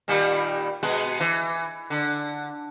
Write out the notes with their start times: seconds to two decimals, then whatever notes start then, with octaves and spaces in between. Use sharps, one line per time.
0.08 A#2 D#3 G3
0.83 B2 G#3 B3
1.20 E3
1.90 D3